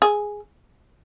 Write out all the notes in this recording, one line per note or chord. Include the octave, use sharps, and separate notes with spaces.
G#4